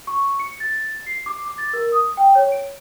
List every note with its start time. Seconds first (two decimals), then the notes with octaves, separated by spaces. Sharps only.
0.07 C#6
0.40 C#7
0.60 A6
1.06 C7
1.26 D6
1.45 D6
1.58 A6
1.73 A#4
1.92 D#6
2.17 G5
2.35 C#5
2.52 D7